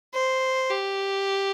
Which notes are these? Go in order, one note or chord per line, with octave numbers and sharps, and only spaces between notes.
C5
G4